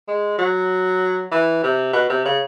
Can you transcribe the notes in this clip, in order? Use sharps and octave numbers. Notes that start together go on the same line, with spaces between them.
G#3
F#3
E3
C3
B2
C3
C#3